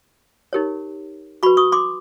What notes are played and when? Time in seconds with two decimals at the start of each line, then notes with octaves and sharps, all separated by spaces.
0.53 D#4 G4 A#4 C#5
1.43 F#4 B4 B5 C#6
1.57 C#6 D#6
1.72 C6 D6